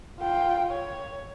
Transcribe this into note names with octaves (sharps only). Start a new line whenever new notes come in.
F4 G5
C#5